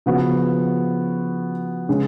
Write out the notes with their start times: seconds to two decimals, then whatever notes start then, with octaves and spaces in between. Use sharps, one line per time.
0.06 C#3 F3 B3 F#4
1.89 C#3 G#3 C#4